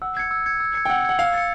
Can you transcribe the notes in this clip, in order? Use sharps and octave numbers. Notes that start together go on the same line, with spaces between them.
F#5 E6
G#6 C#7
E6
G#6 C#7
E6
G#6 C#7
G5
F#5 E6
F#5 G#6 C#7
F5 E6
A6 C#7